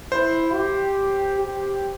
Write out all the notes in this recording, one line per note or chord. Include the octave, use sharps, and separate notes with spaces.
E4 C5
G4
G4